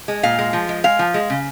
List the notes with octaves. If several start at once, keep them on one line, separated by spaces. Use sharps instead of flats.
G#3
A#2 F5
G#3
F3
G#3
G#3 F5
F3
G#3
C#3